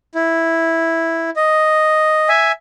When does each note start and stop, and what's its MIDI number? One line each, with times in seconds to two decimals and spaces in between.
0.15 1.30 64
1.36 2.29 75
2.29 2.52 76
2.29 2.52 80